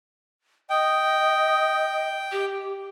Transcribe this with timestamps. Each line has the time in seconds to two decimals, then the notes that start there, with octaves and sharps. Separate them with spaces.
0.70 D#5 G5 D#6
2.32 G4